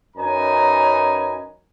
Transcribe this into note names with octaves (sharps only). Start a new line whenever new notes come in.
F#2 C#4 D#4 B4 G#5 A#5